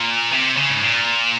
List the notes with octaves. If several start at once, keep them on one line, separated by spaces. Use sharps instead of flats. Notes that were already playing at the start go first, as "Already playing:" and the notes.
Already playing: A#2
C3
C#3
G#2
A#2